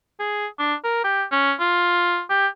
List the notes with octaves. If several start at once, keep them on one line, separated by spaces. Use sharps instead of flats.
G#4
D4
A#4
G4
C#4
F4
G4